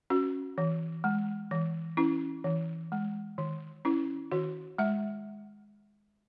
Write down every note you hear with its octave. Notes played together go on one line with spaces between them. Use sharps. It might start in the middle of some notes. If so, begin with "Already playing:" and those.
C#4 F#4
E3
G#3
E3
C#4 E4
E3
G#3
D#3
C#4 E4
D#3 F#4
G#3 E5